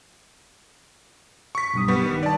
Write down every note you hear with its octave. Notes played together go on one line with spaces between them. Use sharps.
C#6 B6
B1 G2 D#6
G3 B3
D#3
D5 A5